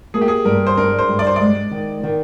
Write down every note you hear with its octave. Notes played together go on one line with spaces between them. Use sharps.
A#3 G#4
G4
G#4
G2 A#4
C5
D4 A#4
C5
G2
D5
C5
G#3 D5
D#3
D#3